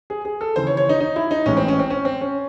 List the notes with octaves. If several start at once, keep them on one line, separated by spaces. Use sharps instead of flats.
G#4
G#4
A4
D#2 C#3 E3 C5
C#5
C#5
D#4
D#4
E4
D#4
A1 A2 G#3 C#4
C4
C#4
C4
C#4
C4
C#4